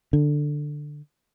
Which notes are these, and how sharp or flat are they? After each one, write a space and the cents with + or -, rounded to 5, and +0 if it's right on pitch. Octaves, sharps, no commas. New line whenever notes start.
D3 +10